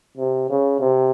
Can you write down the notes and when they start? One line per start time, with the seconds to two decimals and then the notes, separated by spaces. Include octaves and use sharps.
0.18 C3
0.50 C#3
0.80 C3